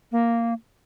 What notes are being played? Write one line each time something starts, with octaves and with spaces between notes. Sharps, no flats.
A#3